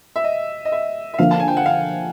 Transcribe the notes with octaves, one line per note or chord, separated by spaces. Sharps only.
E5
D#5
D#5
E5
E5
D3 F3 A#3 F5
A5
G#5
G5
F#5
F5